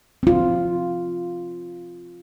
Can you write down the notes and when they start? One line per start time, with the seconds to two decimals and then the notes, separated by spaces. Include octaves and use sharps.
0.23 C4 F4